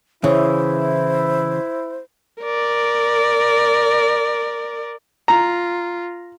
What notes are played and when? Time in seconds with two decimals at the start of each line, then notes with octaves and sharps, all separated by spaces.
0.24 C#3 E3 E4 C5
2.42 A#4 D5
5.28 F4 A#5